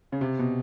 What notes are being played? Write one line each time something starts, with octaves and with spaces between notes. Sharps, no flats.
C#3
C3
B2